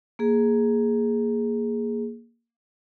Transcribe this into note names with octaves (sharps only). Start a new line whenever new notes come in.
A#3 G#4